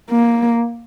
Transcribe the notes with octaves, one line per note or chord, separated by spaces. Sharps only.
A#3